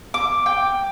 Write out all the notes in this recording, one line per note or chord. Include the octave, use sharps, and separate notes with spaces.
D6
G5